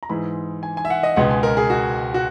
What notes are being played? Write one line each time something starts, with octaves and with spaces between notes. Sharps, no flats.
A#5
G#2 E3 G#3 B5
G#5
G#5
E5
F#5
D#5
C#2 B2 G#3 B3 F#5
G#5
A#4
G#4
F#4
F#4